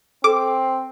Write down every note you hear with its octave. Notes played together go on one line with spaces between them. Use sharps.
C4 A4 D6